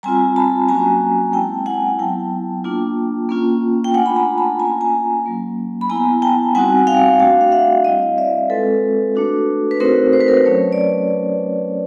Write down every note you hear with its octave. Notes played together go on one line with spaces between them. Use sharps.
G3 C4 F4 G#5 A#5
A5 B5
F#3 A#3 C#4 F#4 G#5 A#5
G#3 C4 E4 G5 A5
F#5 G#5
F#3 B3 E4 G5 A5
A#3 D4 F4
A#3 C#4 F4
G5
A3 D4 F4 F#5 G#5
B5
G#5 A#5
A5 B5
A#3 C#4 F4 G#5 A#5
G#5 A#5
F#3 A#3 C#4
B5
B3 E4 G#5 A#5
G5 A5
G3 C4 D#4 F#4 F#5 G#5
F5 G5
A3 D4 F#4 F5 G5
F5
E5 F#5
G3 C4 E4 D#5 F5
D5 E5
G#3 C4 F4 A4 B4
A3 D4 F#4
B4
A3 C4 D#4 F#4 A#4 C5
C5
B4
A#4 C5
F#3 A3 C#4 B4 C#5
D5